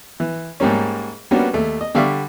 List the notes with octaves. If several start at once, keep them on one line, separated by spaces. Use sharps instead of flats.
E3
G#2 G3 A#3 C#4
G3 A#3 B3 C#4 D4 F#4
D#2 A3
D#5
D3 G3 D5 E5 F5 C#6